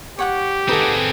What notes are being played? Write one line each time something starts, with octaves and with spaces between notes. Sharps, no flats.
G4 C#5 F#5 C#6
C4 D#4 G#4 A4 B4 F#5